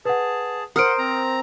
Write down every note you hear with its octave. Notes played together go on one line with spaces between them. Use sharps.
G#4 B4 F#5 A5
A#4 C5 F#5 D#6 F6 D7
C4 A#5